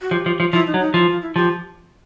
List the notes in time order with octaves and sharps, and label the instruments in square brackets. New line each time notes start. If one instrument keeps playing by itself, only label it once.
[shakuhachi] F#4
[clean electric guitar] F3 [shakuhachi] G4
[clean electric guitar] F3
F3
[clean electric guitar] F3 [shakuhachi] E4
[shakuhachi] D#4
[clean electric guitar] F#3
[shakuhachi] D#4
[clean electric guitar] F3 [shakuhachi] E4
[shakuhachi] F4
E4
[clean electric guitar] F3 [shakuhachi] G4